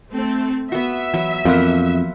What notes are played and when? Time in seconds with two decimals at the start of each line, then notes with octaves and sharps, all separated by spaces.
0.11 A3 C4 A4
0.72 B3 F#4 E5
1.14 E3 F#3
1.45 F2 E3 F3 A#3 B3